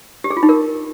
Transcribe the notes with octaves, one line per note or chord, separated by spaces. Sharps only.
G4
G#4
F4
D#4
A#4